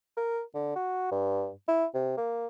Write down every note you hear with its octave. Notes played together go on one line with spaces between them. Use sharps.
A#4
D3
F#4
G2
E4
C3
A#3